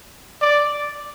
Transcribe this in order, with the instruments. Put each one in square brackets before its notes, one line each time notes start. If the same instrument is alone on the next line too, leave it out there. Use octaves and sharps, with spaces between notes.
[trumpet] D5